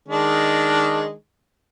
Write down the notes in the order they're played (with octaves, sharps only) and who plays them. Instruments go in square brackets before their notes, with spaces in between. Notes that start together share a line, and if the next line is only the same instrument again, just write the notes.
[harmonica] D#3 G#3 D4